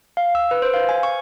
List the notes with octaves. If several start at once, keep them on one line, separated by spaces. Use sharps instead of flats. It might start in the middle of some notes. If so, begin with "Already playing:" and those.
F5
E6
B4
C5
F5
G#5
C#6